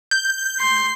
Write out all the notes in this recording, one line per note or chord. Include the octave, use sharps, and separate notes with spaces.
G6
C6